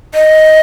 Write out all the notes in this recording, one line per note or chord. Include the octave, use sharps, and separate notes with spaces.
D#5